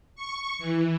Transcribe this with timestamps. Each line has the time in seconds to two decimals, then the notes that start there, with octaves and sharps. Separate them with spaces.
0.15 C#6
0.59 E3